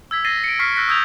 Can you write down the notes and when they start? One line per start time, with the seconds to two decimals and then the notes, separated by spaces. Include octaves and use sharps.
0.11 E6 G#6 B6
0.25 A6 A#6 C7 D#7 G7
0.44 C#7 D7
0.59 C#6 E6 F6 B6 C7
0.75 E6 F#6 A#6 B6
0.88 D#6 E6 G6 G#6 F7